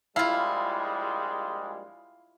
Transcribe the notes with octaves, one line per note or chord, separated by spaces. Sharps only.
A#1 G3 G#3 E4 F4 F5